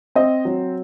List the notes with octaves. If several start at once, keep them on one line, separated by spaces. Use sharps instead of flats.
C4 D#5
F#3